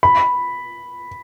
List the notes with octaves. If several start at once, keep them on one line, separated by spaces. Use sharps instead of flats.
B5